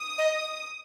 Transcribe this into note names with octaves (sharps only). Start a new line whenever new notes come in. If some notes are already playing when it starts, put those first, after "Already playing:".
Already playing: D#6
D#5